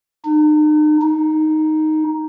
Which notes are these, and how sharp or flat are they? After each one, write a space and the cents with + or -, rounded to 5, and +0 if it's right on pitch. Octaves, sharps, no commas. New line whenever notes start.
D#4 -40
D#4 +0